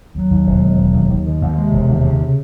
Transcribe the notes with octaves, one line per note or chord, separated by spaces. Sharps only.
D#2 F#3
D#2
E1
D#3
E1
D#2
D#2
D#3
D#2
C3 G#3
E1
D#2
C#3
C#3